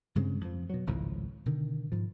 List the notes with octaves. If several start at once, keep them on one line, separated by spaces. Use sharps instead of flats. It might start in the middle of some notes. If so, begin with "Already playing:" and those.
G2 C#3 G#3 C4
F2 F3
B2 F#3
G#1 C#2 A2 F3
B2 D3 D#3
G#2 F3